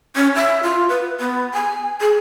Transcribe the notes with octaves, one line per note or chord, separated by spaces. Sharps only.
C#4
E5
F4
B4
B3
G#5
G#4